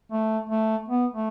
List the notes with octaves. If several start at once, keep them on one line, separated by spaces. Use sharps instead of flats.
A3
A3
B3
A3